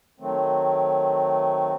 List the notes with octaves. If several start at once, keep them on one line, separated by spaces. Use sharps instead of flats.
D#3 F#3 A3 C4